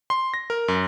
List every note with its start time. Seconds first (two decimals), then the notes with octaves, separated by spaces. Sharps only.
0.10 C6
0.34 A#6
0.50 A#4
0.68 F#2